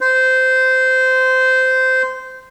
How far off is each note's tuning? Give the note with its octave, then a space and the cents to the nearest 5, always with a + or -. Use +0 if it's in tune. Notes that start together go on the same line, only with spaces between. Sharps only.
C5 -15